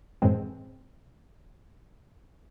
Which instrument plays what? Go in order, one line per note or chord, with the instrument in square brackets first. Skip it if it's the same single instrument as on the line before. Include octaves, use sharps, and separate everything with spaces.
[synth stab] F#2 A2 E3 G#3 C4